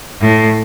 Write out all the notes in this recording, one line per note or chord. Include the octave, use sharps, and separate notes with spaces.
A2